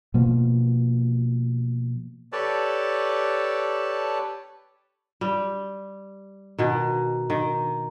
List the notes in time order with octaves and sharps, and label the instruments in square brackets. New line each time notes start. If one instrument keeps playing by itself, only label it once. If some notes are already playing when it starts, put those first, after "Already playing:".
[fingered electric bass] B2 F3 A#3
[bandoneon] G4 A4 B4 C#5 D5 A5
[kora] G3
B2 D#3
D#3